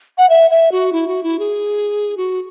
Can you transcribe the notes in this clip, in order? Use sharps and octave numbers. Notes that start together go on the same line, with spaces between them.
F#5
E5
E5
F#4
E4
F#4
E4
G#4
F#4